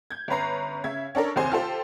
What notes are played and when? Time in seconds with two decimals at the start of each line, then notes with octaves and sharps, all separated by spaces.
0.10 G6 G#6
0.28 G1 C#4 B4 A#5 C7
0.84 C#3 E5 G#6
1.15 C#4 D4 A4 A#4
1.36 F#1 D#2 C3 G#4 C5 G#5
1.51 F4 G4 A4 C5